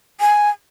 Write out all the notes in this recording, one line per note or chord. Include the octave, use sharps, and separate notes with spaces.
G#5